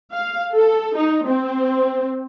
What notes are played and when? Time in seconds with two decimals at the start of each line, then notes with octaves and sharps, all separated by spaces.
0.13 F5
0.53 A4
0.96 D#4
1.26 C4